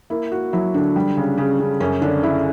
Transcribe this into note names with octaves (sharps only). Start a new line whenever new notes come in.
A#3 E4
A#3 F#4
F#3 E4
D3 D4
G3
C#3
C#3
C#3
F#2 C#4
D3 D4
D3 E4